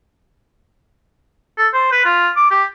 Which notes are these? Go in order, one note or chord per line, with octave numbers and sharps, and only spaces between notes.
A4
C5
B4
F4
D6
G4